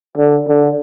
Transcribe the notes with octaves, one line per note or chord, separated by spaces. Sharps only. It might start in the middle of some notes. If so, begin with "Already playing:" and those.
D3
D3